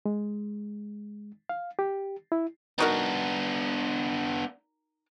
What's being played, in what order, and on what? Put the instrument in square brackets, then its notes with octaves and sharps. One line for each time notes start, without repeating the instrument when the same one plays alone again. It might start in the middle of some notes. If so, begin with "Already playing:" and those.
[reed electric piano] G#3
F5
G4
E4
[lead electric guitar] B3 D4 [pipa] D#4 F#4 A#4